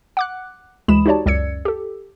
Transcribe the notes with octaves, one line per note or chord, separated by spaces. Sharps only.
F#5 D6 F#6
D2 E3 G#3 B5 D#6 E7
D#4 F#4 G4 C#5 D5 A5
C#2 F#2 D5 E6 G#6 C#7
G4 A4